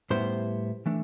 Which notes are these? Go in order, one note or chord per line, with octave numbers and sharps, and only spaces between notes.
A2 G3 B3 E4 C5
E3 A3 D4